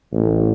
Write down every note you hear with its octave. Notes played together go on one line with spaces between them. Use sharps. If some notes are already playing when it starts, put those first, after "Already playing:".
A1